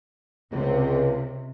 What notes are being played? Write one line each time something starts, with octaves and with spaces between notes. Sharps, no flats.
C#2 C3